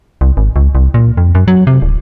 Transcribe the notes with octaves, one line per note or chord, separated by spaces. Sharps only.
C2
G#1
C#2
C2
A#2
F2
F#2
F#3
C3
D1